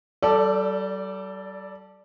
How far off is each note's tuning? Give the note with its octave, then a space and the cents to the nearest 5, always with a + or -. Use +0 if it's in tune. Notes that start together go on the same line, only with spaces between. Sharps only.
G3 -35 A4 +0 D5 +0